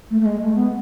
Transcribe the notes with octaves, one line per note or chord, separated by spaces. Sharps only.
A3
A3
G#3
A3
B3